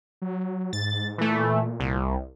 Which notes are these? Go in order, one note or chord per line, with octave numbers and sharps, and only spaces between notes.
F#3
G#2 A6
A#2 E3 A3
C2